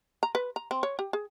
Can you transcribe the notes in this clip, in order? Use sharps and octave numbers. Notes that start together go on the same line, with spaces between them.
A#5
B4
A#5
C4
C#5
G4
G#4